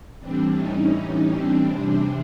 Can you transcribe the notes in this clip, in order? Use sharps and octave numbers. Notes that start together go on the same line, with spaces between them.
A2 E3 G3 C4 D4
C#4 D#4
C4 D4
E2 C3 E3 G3